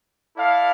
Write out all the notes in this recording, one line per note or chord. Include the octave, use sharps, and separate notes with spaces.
E4 A4 D5 F5